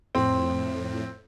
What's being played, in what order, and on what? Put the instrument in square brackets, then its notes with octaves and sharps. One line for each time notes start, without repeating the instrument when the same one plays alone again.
[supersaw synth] F2 A2 [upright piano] C4